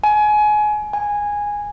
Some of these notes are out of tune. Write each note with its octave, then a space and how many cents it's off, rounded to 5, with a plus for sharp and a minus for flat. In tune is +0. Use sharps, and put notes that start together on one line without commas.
G#5 +25
G#5 -10